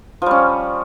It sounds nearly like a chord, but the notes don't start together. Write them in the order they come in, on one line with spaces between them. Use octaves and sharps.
F3 G3 C#4